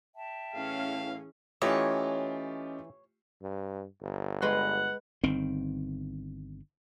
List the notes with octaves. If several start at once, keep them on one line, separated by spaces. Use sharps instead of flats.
E5 G5 A5
A2 E3 C#4 G#4 F5
E3 A3 C#4 F4 G4 C#5 D#5
G2
G1
G#3 B4 F#5 C6
G1 D#3 C4